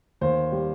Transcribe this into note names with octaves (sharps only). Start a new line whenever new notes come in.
D#2 C5
G3